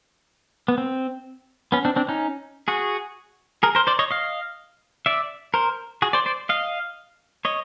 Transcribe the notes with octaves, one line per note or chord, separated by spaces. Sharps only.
B3
C4
B3 C#4
C4 D4
C4 D4
C#4 D#4
F#4 G#4
G#4 A#4
A#4 C5
C5 D5
C#5 D#5
D#5 F5
D5 E5
A#4 C5
F#4 G#4
C5 D5
C5 D5
D#5 F5
C#5 D#5